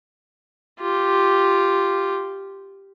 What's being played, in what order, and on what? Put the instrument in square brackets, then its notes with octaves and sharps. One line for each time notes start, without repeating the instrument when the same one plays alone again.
[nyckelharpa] F4 G4